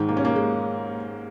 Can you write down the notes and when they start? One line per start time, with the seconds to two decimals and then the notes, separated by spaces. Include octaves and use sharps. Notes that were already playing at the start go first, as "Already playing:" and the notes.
Already playing: G#2 D#3
0.08 A#3
0.17 C#4
0.25 A#3
0.36 G#3